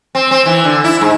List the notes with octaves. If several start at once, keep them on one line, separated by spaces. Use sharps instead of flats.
C4
C4
E3
D3
E4
G#2